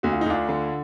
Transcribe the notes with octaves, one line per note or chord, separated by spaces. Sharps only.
D2 F#4
F4
D#4
D2 D4 F4
D3